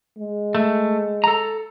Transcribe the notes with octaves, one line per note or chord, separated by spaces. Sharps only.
G#3
A3
A4 A#5